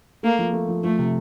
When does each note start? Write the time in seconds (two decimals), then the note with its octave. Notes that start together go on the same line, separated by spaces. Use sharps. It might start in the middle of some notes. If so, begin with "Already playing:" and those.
0.23 A3 A#3
0.39 F3
0.53 A3
0.69 F3
0.84 F3 A3
0.99 C3